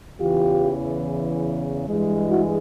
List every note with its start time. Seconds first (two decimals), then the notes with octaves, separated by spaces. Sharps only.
0.19 E2 C#3 E3 F4 G4
1.87 G2 E3 G#3
2.28 E4 F#4